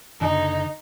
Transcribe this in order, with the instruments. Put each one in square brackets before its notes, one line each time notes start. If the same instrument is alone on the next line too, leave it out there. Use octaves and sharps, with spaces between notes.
[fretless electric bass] F#1 D3 [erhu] D#4